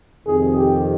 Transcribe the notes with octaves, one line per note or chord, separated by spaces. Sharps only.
F2 C3 D#3 G#4
G4